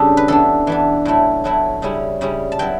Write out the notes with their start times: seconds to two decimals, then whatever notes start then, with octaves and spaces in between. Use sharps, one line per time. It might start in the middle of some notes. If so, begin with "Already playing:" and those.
Already playing: C#3 G3 D4 G4 A4
0.17 B4
0.28 E3 B3 D4 A4
0.67 E3 B3 D4
1.05 A2 F#3 A3 E4
1.44 A2 F#3 A3 E4
1.82 C#3 G3 C#4 E4
2.21 C#3 G3 C#4 E4
2.52 A5
2.59 F#3 B3 E4 G5